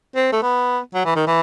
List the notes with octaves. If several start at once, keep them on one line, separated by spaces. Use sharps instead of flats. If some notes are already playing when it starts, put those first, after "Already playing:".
C4
A3
B3
F#3
E3
D#3
E3